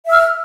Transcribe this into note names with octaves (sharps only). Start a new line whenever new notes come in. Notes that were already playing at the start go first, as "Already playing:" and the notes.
E5 E6 F6